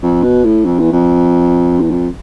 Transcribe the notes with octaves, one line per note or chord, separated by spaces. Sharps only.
F2
B2
A2
F2
E2
F2
E2
F2